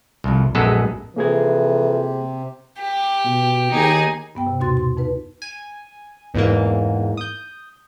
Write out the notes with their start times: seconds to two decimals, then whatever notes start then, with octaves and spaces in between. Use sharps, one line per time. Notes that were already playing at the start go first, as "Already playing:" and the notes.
0.24 C2 F2
0.55 A#1 F#2 G#3 B3 A4
1.16 F2 C3 E3 A#3 G#4 G#6
2.80 G4
3.25 B2
3.72 D#2 D#4 G#4 G#5
4.35 G2 B3 G5
4.47 C3
4.60 D#2 B2 F#4 C6 A6
4.77 C6
4.97 F2 D#4 B4
5.42 G#5
6.34 E2 G#2 E3 A#3
7.17 D#6 G6